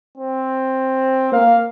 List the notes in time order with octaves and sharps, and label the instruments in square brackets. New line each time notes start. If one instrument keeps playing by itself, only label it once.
[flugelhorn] C4
[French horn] A#3 [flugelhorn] F5